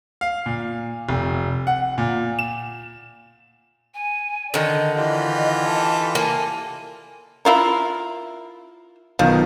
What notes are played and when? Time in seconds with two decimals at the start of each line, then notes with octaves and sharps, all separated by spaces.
0.21 F5
0.46 A#2
1.09 F1
1.67 F#5
1.98 A#2
2.39 E7
3.94 G#5
4.54 D3 D#3 D5 D#5
4.95 E3 F4 G4 D#5
5.65 A4
6.15 A#3 G#5
7.45 E4 F4 A#4
9.19 B1 D#3 F3 B3